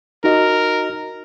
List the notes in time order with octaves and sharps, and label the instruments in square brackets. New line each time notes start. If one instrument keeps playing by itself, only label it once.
[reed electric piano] D#4 F#4 D#5 [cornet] A#4